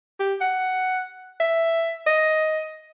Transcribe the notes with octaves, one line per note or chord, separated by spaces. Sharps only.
G4
F#5
E5
D#5